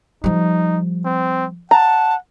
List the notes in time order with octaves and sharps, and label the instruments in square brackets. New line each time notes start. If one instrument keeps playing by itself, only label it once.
[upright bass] F3 G3 [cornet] D#4
[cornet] C4
[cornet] F#5 [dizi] A5 [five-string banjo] A#5